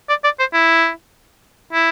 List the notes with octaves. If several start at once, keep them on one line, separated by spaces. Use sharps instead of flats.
D5
D5
C5
E4
E4